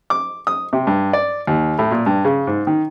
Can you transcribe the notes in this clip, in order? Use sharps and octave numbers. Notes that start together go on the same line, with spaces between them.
D6
D#6
C3
G2
D5
D#2
A2
A#2
G2
C#3
G#2
D#3